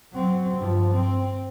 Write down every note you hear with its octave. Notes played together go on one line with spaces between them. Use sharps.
F#3 C4
G2 F3
C4